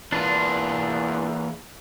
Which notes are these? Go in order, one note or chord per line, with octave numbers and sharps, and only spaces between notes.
E2 E3 A#3 D4 F4 B4